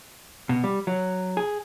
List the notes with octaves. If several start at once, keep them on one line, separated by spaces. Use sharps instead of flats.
B2
G3
F#3
G#4